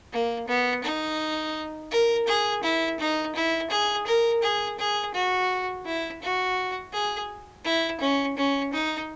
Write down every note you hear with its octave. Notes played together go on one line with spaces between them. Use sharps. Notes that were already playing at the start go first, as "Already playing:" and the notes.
A#3
B3
D#4
A#4
G#4
E4
D#4
E4
G#4
A#4
G#4
G#4
F#4
E4
F#4
G#4
E4
C#4
C#4
D#4